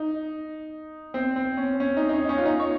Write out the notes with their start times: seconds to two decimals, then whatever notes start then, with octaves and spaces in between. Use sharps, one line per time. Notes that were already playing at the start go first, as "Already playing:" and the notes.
Already playing: D#4
1.14 C4
1.36 C4
1.57 C#4
1.80 C#4
1.97 D#4
2.09 D#4
2.13 C#4
2.29 C#4
2.38 F4
2.46 D#4
2.60 C#5